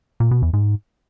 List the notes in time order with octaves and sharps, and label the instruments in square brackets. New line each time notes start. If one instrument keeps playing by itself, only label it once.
[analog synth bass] A#2
B2
E2
G#2